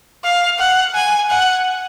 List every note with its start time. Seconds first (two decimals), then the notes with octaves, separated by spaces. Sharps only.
0.24 F5
0.59 F#5
0.94 G#5
1.30 F#5